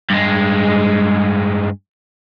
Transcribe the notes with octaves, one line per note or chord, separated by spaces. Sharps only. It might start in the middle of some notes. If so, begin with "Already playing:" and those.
G2 G#3